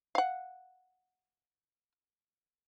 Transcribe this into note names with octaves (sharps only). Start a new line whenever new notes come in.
F5 F#5